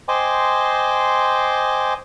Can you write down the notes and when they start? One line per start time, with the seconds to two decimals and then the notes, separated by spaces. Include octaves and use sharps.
0.08 C5 D#5 G5 G#5 C6 D6